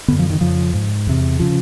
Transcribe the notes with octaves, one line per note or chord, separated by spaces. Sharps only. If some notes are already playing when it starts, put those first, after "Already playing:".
F#2 D3 B3
F3
D#3
F2 C#3 F3
G#2
E2 C3
C#3 F3